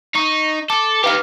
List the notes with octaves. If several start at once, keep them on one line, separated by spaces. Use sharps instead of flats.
D#4 C#6
A4 D6
D#4 G4 B4 F5 F6